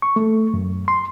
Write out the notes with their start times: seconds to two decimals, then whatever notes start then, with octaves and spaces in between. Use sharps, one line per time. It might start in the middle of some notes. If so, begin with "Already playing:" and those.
0.02 C#6
0.16 A3
0.54 F#2
0.88 C6